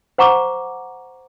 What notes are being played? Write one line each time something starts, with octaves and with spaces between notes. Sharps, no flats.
C5 F#5 A#5 C#6 D6